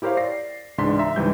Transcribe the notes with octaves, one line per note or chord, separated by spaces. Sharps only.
E4 G4 A#4 C5 C#5 F5
D5 A#6 C7
C#2 G#2 E3 D4 C6 B6
E5 A#5
C#2 G#2 E3 G3 D4 G6